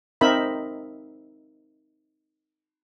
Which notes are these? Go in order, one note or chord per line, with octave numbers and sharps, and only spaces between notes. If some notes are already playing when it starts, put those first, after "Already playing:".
C4 D#4 A#4 E5 B5